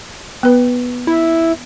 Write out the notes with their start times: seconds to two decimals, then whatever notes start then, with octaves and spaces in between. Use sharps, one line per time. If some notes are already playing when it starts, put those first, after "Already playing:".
0.43 B3 B4
1.07 E4